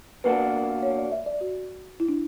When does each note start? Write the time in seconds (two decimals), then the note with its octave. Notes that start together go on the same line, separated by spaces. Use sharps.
0.24 B2 A#3 D4 F#4 B4
0.83 C#5
0.98 D5
1.12 E5
1.26 D5
1.41 F#4
2.00 E4
2.08 D4